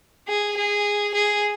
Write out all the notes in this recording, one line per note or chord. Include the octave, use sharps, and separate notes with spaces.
G#4
G#4
G#4